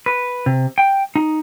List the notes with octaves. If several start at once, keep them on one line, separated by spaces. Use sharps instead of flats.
B4
C3
G5
D#4